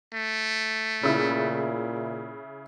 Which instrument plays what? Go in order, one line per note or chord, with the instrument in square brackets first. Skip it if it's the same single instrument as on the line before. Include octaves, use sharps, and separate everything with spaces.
[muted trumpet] A3
[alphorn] A#2 [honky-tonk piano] C#3 E4